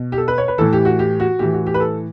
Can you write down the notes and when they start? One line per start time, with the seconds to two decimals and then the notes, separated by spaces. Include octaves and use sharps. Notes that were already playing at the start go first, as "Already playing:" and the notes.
Already playing: B2
0.12 G4
0.18 A4
0.28 B4
0.38 C#5
0.48 B4
0.58 A2 E3 A4
0.73 G4
0.85 F#4
0.99 G4
1.20 F#4
1.39 A2 E3 G4
1.53 F#4
1.66 G4
1.74 B4
1.80 A4